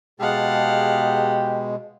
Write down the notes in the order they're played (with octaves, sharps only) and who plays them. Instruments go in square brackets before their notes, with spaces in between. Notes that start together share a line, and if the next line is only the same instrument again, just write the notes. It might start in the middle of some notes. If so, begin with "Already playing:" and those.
[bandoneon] B2 G#3 [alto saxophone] G4 [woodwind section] G#4 A5 [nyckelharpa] F5 F#5